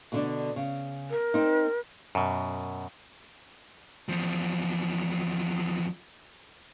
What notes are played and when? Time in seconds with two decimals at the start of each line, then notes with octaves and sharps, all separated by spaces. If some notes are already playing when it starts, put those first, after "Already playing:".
0.12 B2 D3 D4
0.56 C#3
1.11 A#4
1.34 C4 D#4
2.15 F#2 B2
4.09 E2 F3